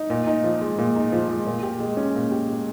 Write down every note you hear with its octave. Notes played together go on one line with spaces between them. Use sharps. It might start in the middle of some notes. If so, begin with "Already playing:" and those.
Already playing: D#4
A#2
D#4
F3
G#3
A#2
D#4
F3
G#3
A#2
G4
G#3
C#4
A#2
G4
G#3